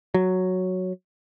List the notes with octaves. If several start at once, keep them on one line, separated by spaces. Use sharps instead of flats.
F#3